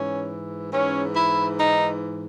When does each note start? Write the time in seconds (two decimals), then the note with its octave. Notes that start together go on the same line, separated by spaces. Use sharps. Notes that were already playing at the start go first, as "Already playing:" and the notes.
Already playing: G#2 E3 C#4
0.71 G#2 E3 C#4
1.15 E4
1.58 D#4